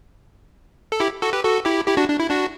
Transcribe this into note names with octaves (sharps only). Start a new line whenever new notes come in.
A4
E4 G4
F#4 A4
G4 B4
F#4 A4
E4 G4
E4 G4
D4 F#4
D4
E4
D4 F#4